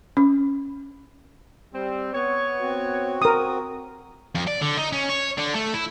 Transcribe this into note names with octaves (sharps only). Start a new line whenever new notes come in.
C#4
G3 C4
B3 C#5
C4 F#4
A#4 D#6
F2
D5
D3
D#4
C#4
C#5
D3
A3
E4